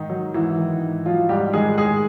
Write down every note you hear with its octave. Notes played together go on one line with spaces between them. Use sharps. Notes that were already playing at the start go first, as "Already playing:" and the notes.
Already playing: G#2 D#3 D#4
F#3
G#2 E3 E4
D#3
G#2
F3 F#3 F4
G#2 G3 G4
D#3 G#3 G#4
A2 G#3 G#4